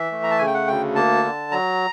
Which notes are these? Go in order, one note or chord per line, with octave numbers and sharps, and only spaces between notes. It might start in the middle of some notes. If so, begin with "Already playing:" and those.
Already playing: E3 E5
A3
A#5
A5
C#3 G#5
G5
F#5
D2 G5
A#3 A5
D3
F#3 A#5